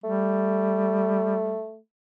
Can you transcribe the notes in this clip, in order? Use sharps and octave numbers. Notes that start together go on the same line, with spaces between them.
G3 A3